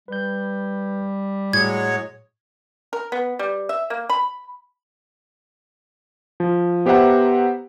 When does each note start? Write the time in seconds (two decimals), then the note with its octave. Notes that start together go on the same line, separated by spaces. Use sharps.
0.08 G3 B4 G6
1.53 A2 F#3 G#3 C#5 G#6
2.93 A#4
3.12 B3
3.39 G3
3.69 E5
3.90 A#3
4.09 B5
6.40 F3
6.86 B3 G4 C5 E5 F#5 A#5